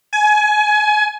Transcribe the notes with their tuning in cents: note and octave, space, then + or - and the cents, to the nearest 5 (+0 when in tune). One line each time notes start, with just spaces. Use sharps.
G#5 +25